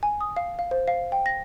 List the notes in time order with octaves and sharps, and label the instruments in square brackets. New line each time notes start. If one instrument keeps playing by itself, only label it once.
[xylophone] G#5
D#6
F5
F5
C5
F5
G5
A#6